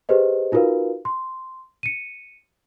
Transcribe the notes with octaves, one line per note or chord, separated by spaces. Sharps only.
G4 G#4 B4 C5 D#5
D#4 F4 F#4 A#4 B4 F5
C6
C#7 D#7